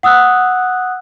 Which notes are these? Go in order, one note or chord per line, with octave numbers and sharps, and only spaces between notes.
F#5 D#6 E6 F#6